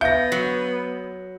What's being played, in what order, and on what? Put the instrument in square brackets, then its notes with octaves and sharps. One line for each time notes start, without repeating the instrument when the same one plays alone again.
[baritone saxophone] B3 [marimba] E5 F5 [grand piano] G6 A#6
[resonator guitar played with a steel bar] F#3